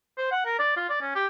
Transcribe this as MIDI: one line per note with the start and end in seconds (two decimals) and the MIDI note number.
0.17 0.30 72
0.31 0.45 78
0.46 0.56 70
0.59 0.73 74
0.77 0.89 65
0.89 1.00 74
1.01 1.12 61
1.15 1.27 67